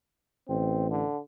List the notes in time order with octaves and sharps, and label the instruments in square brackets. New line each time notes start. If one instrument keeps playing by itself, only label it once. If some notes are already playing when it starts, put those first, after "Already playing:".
[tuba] A1 [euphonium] C4
[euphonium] D3